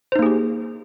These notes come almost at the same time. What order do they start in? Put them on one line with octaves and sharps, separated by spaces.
C5 D#4 A#3 G#4 G4